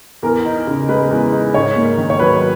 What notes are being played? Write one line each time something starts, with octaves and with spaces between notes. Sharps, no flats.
E2 A#4
D#4
C#3
G#3 B4
E2
D#4
G#2 C#5
A#3
D#3
C#5
F#3 B4